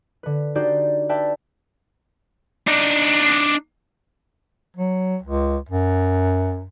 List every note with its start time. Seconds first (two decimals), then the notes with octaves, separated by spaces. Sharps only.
0.23 D3 B4
0.55 D4 D#4 F#4 G4 C5 D5
1.09 B4 D5 E5 G5 A5
2.68 D4 D#4
4.77 F#3
5.22 C#2
5.69 F#2